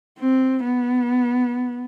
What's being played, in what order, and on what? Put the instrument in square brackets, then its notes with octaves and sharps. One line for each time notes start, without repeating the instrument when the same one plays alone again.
[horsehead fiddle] C4
B3